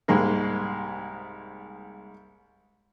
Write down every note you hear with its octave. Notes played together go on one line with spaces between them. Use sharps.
C2 G#2 G#3 A#3